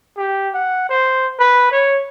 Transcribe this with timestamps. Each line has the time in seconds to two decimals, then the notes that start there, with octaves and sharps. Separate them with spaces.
0.18 G4
0.54 F#5
0.89 C5
1.39 B4
1.72 C#5